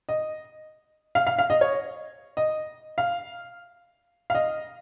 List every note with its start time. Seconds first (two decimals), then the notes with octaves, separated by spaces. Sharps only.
0.09 D#5
1.15 F5
1.27 F5
1.39 F5
1.50 D#5
1.61 C#5
2.37 D#5
2.98 F5
4.30 F5
4.35 D#5